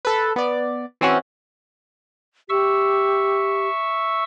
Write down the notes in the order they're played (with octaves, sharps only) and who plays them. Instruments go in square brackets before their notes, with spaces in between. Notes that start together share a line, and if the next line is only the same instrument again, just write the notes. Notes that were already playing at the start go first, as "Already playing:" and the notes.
[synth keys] A4 B4
B3 D5
E3 C4 C#4 F#4
[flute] G4 [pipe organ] E5 C#6 E6